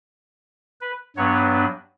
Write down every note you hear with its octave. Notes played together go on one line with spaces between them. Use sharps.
B4
G2 F#3 B3 D4 C#5